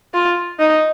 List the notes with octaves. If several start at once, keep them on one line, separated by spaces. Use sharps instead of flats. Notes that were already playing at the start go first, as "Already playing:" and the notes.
F4
D#4